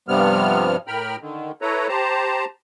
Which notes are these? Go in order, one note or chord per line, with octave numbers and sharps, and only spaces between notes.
G2 C3 F3 G3 B3 F6
A2 A#4 G5 B5 F6
D3 D#3
E4 A4 B4 C#5 A#5
G4 C5 A5 A#5